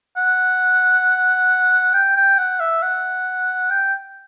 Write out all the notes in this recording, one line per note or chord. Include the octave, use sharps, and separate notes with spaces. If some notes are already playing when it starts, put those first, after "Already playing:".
F#5
G5
G5
F#5
E5
F#5
G5